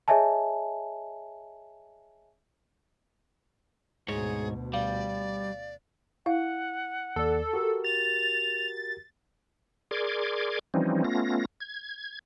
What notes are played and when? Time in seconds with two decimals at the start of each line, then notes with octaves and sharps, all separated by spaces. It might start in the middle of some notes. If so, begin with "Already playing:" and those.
0.08 G#4 C#5 D#5 E5 G#5 A5
4.08 D2 G#2 B2 G#4 C#5
4.73 G3 D5 F5
6.26 E4 F5 F#5
7.16 D#2 A4 D5
7.53 F#4 G4 A#4
7.85 A6 F7
9.91 G#4 A#4 D5 C6 D6 G#6
10.74 E3 F3 G3 C4 C#4 D#4
11.04 A3 B3 C#4 F4 A#6
11.60 G#6